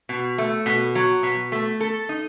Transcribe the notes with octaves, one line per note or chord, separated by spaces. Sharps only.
B2
A3
B2
F#3
B2
A3
A4
D#4